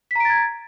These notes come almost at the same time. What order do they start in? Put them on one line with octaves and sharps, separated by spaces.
B6 A#5 D7 A6 G#6